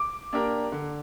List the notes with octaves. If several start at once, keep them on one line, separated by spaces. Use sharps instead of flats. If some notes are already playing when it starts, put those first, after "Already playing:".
Already playing: D6
A#3 D4 G4 A#4
D3